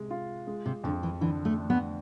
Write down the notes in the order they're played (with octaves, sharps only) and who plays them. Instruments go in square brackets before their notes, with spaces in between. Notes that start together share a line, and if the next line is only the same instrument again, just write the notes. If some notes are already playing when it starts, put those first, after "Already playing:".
Already playing: [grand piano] C3 G#3
F4
G#3
[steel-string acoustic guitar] C3
[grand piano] F2 [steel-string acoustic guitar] D3
[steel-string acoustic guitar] E3
[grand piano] D3 [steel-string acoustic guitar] E3
[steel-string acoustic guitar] A3
[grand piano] D4
[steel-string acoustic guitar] B3